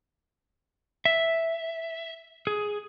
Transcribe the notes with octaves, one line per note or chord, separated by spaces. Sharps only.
E5
G#4